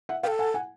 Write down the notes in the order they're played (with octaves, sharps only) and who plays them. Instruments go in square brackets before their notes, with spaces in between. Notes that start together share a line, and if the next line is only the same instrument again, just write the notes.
[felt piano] E5 F#5
[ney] B4 [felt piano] F5 G5
[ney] A4
[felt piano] F#5 G#5
F#5 G#5